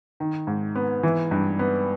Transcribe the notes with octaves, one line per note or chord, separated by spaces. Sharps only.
D#3
G#2
B3
E3
G2
B3